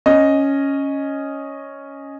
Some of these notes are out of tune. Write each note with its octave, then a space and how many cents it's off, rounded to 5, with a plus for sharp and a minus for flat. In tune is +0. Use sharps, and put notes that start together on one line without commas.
C#4 +0 D#5 +0